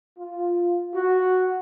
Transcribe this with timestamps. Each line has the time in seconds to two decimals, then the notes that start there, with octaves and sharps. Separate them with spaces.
0.18 F4
0.95 F#4